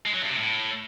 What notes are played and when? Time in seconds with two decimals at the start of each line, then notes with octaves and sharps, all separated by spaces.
0.06 G#3
0.14 F#3
0.22 G2
0.30 C3
0.37 A2